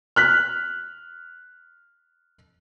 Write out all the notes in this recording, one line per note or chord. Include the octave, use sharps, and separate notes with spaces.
F6 F#6 B6